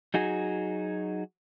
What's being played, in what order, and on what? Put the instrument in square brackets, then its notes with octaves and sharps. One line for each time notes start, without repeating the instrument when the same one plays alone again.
[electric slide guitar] F#3 D#4 F#4 G#4